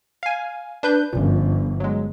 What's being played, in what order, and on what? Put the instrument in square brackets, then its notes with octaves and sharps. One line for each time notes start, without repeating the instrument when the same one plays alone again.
[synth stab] F5 G#5
D4 B4 G6
[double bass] G1 F3 [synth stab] F#2 A#2
[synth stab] F#3 G#3